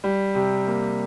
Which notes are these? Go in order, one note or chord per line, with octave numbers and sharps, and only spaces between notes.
G3
C3
A#3